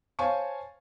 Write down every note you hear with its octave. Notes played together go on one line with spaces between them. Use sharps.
C5 C#5 F5 G#5 A5 C#6